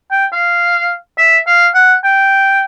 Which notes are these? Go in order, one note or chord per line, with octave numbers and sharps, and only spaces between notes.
G5
F5
E5
F5
F#5
G5